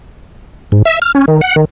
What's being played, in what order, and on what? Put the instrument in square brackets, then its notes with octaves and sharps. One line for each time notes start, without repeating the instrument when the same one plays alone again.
[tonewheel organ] G#2
E5
F6
C#4
D#3
F#5
D#3